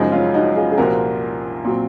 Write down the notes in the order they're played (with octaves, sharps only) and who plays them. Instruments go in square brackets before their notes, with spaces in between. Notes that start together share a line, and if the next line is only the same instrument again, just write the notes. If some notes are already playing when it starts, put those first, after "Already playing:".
Already playing: [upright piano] F#1 F#2 F3 G#3 [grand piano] D#4 F#4
[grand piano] C#4 F4
D#4 F#4
F4 G#4
G#4
[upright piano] C2 A#2 F3 A#3 F4 [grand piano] F#4 A#4
[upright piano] A#2 F#3 C4